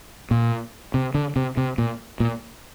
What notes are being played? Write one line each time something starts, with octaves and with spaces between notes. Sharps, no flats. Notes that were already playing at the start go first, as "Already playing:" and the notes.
A#2
C3
D3
C3
C3
A#2
A#2